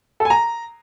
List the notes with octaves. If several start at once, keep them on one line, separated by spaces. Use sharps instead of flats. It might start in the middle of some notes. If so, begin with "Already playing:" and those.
A4
G#5
A#5